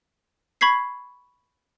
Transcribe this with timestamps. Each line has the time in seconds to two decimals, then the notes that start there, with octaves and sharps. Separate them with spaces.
0.61 B5 C#6 G#6 B6 C7